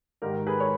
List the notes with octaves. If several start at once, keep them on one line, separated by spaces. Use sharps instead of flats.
G#2 D#3 G4 A#4
G#4 B4
C#5